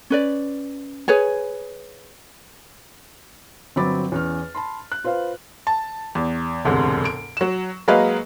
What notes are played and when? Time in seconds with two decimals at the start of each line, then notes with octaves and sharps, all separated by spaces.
0.10 C#4 B4 D5
1.08 G#4 B4 C#5 G#5
3.76 G1 F#3 C4 B5 D6 A6
4.12 E2 C#4 F6
4.55 A5 B5 C6
4.92 F#6
5.04 F4 B4 C5 F5
5.67 A5
6.15 E2
6.65 E1 D2 G#2 C3
7.05 D7
7.37 F#3 E7
7.88 F#3 G#3 A#3 B4 D#5 F5